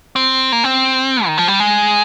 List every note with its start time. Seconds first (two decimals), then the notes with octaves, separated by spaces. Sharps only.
0.16 C4
0.52 A#3
0.64 C4
1.26 D#3
1.38 F3
1.48 G3
1.60 G#3